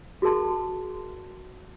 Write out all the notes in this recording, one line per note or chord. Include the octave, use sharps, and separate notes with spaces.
F#4 G#4 A#4 A5 C6